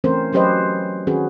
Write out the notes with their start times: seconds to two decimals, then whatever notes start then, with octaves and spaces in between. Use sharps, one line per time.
0.04 E3 A3 C4 C#4 A#4 C5
0.33 F#3 C#4 G4 B4 C5 D#5
1.07 D#3 C4 C#4 F#4 G#4 B4